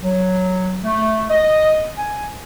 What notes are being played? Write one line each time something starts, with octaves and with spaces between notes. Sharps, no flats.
F#3
A3
D#5
G#5